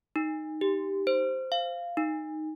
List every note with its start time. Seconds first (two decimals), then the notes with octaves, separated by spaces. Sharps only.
0.16 D#4
0.61 G4
1.07 C5
1.52 F5
1.97 D#4